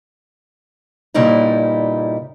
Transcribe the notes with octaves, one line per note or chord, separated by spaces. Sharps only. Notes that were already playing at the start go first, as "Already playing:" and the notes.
G2 A#2 C#3 G3 D#4 E4